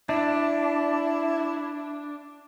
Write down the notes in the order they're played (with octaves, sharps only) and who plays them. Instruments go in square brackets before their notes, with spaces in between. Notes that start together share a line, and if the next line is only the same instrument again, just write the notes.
[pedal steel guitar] D4 [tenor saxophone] E4